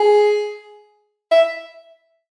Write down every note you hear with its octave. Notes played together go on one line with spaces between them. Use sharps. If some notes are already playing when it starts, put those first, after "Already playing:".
Already playing: G#4
E5